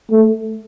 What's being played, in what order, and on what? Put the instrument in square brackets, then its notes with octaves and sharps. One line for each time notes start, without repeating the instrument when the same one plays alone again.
[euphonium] A3